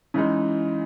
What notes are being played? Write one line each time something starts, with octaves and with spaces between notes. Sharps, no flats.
C#3 E3 G#3 D#4